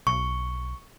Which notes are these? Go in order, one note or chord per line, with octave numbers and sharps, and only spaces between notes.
B1 C#6